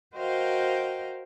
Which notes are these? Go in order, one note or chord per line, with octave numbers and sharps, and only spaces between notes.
F#4 A#4 C5 D#5 F5 G5